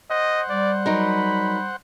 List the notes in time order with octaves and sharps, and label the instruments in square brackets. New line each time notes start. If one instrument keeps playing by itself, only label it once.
[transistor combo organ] C5 F#5 [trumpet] D#5
[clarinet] G3 [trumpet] D5
[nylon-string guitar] F#3 D#4 A#4 [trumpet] B5